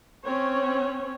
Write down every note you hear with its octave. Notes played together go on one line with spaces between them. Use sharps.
C4 C#4 C#5